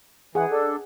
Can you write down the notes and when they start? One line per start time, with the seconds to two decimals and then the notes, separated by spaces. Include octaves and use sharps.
0.35 E3 G#4 F#5
0.51 D4 A4